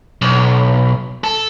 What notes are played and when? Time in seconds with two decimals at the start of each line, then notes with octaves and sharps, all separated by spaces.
0.22 B1
1.24 A4